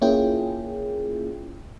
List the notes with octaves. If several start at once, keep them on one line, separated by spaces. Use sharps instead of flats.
A#3 C#4 E4 F4 G#4 G5